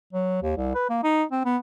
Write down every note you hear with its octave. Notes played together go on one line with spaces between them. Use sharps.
F#3
D#2
C2
B4
A#3
D#4
C4
B3